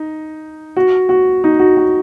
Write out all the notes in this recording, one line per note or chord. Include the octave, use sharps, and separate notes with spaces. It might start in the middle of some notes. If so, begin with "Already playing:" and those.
Already playing: D#4
F#4
F#4
D#4
F#4
F#4